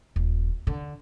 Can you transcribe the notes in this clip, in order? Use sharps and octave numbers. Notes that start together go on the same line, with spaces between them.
D#1
D3